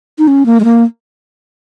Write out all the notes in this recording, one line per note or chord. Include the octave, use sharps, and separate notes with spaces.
D#4
C#4
A#3
G#3
A#3